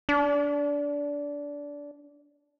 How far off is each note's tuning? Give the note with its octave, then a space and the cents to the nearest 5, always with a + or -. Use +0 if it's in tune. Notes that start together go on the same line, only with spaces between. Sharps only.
D4 -20